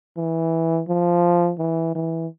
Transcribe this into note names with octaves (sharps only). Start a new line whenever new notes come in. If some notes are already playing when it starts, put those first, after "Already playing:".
E3
F3
E3
E3